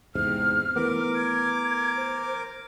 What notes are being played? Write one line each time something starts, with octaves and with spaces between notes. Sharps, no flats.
E2 G#2 C3 F6
E3 A3 B3 A#4 D6
G#6
C5